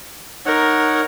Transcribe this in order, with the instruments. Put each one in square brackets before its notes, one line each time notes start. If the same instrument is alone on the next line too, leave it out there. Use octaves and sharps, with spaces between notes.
[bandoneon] D#4 C#5 F#5 [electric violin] A#4